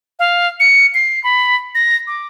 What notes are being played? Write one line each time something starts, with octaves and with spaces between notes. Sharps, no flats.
F5
C#7
C7
B5
A#6
D6